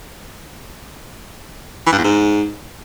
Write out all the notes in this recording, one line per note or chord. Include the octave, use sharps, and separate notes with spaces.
E3
G2
E2
G#2